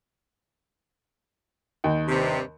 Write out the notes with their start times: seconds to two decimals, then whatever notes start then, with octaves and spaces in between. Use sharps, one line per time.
1.84 D#2
2.08 G2 C3